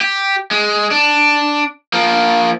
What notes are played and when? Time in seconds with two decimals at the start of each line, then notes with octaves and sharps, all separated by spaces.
0.01 G4
0.51 G#3
0.91 D4
1.93 F3 A#3